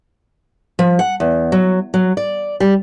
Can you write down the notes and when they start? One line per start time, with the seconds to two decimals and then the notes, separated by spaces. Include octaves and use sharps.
0.79 F3
0.99 F#5
1.20 E2
1.52 F#3
1.94 F#3
2.17 D5
2.60 G3